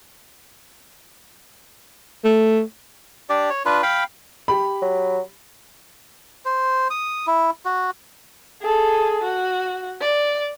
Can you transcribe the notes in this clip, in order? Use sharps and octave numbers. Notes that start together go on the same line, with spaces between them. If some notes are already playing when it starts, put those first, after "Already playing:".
A3
D4 G4 D5
C#5
D4 F4 B4
F5 G5 B5
G4 B5
F#3
C5
D#6
E4
F#4
G#4 A4
F#4
D5